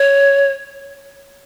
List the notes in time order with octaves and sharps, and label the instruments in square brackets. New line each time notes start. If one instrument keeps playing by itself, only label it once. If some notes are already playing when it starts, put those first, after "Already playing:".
Already playing: [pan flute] C#5